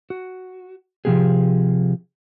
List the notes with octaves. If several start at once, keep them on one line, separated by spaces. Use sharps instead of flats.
F#4
C3 F3 F#3 B3 G4 G#4